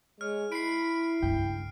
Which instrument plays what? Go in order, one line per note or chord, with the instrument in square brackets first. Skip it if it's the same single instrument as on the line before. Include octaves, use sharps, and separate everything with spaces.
[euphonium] G#3 [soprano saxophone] C#5 [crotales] F6
[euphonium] E4 [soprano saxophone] B5 [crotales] C7 D7
[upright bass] C#2 G2 [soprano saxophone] G5